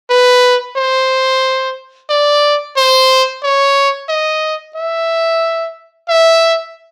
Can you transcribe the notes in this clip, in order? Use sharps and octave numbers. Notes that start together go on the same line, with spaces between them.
B4
C5
D5
C5
C#5
D#5
E5
E5